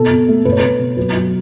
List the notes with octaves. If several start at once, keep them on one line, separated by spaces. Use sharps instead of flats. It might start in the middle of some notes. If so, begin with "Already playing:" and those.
Already playing: B2 A4
B2
A3
B2 B4
C#5
B2 B4
B2
F#3 B4
F#3